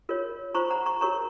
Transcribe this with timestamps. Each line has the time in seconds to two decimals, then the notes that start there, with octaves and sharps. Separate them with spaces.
0.09 F4 A#4 C#5
0.54 F4 C5 A#5 C#6
0.71 F#5 A#5
0.86 A#5 C#6
1.01 F#4 A#4 C#5 A#5 C#6